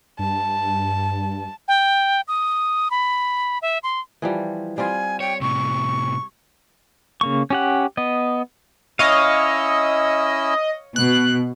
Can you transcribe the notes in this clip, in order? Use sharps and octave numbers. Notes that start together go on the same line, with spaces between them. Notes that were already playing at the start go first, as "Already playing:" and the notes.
G2 A5
G5
D#6
B5
E5
C6
E3 F3 G3
G3 C4 F4 G#5
C#5 G5
A2 C3 C#6
C#3 A#3 C#6
C#4 G4 F#5
B3 D#5
C#4 E4 C#5 D#5 F5 E6
B2 F#6